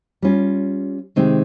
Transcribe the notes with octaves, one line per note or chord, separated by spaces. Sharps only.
G3 C#4 F4
C3 D#3 G#3 C4 D#4